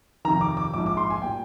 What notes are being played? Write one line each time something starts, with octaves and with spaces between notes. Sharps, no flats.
F2 C3 D#3 A#5
D6
D6
A#1 G#2 F3 D6
D6
C6
G#5
A#2 G3 G5